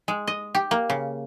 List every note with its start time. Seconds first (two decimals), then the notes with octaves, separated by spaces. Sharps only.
0.08 G#3
0.27 D#5
0.55 G4
0.71 A#3
0.90 C#3